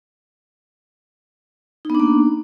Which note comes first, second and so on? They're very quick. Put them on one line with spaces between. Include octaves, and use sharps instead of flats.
D#4 B3 D4 A#3